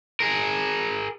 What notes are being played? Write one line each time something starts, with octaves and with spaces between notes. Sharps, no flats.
G#4 A#4